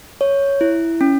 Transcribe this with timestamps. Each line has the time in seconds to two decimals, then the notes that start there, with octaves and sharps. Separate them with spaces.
0.21 C#5
0.61 E4
1.01 C#4